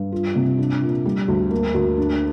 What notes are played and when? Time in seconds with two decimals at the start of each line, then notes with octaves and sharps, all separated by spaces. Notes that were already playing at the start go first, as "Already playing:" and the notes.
Already playing: G2
0.12 F4
0.35 C3
0.58 D4
0.82 A#2
1.06 G3
1.28 D2
1.51 A#3
1.74 D2
1.98 D4